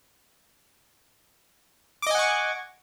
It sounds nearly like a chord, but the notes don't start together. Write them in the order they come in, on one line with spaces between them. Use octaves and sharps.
D6 D#5 G#5 F#5 C#6